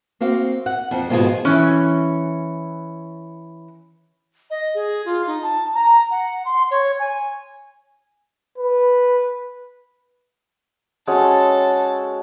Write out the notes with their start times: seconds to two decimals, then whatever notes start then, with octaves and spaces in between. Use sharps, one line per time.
0.21 A#3 C4 F#4 F5
0.66 F#5
0.91 F2 F3 F#5
1.09 G#2 B2 D#3 F3 F4 G#4
1.45 E3 C#4
4.50 D#5
4.74 G#4
5.05 F4
5.27 D#4
5.43 A5
5.74 A#5
6.11 F#5
6.45 C6
6.71 C#5
6.99 G#5
8.58 B4
11.08 G#3 C#4 F#4 A4 A5